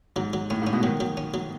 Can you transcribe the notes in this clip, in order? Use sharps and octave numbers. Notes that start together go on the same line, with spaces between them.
G#2 F#3
F#3
A2 C#4
G#2
C#4
B2
D#3 F#3
F#3
C#4
F#3